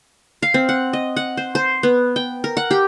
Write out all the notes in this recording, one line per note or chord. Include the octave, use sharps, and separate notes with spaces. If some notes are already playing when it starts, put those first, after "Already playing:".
F5
C4
F#5
D#5
F#5
C5
C5
B3
G5
A#4
F#5
G4